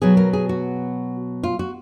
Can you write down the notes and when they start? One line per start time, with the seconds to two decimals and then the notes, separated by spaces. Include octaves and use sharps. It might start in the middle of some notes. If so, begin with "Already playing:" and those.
0.02 B2 F#3 B3 G#4
0.17 A#4
0.33 G#4
0.49 F#4
1.43 F4
1.59 F#4